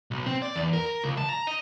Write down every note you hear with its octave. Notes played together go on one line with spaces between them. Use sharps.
B1
C4
D5
E2
A#4
A#4
C#2
A5
A#5
D#5